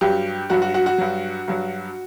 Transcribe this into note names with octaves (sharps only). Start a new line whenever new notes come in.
G2 F#3 G4
G2 F#3 F#4
F#4
F#4
F#4
G2 F#3
G2 F#3